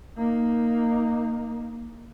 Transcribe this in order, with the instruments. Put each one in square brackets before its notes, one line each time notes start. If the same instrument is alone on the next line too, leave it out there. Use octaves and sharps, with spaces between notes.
[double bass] A#3 D#4